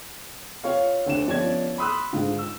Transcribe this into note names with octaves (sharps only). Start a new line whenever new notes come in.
F4 C#5 F5
D2 D3 D4 E7
G1 F3 C#4 D5 G#6
B5 C6 D#6 E6 F#6
G#2 D3 G#3 F4
E6